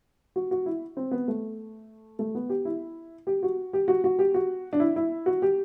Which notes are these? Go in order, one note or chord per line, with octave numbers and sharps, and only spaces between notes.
F#4
F#4
E4
C4
B3
A3
A3
B3
G4
E4
G4
F#4
G4
F#4
F#4
G4
F#4
D4
E4
E4
F#4
G4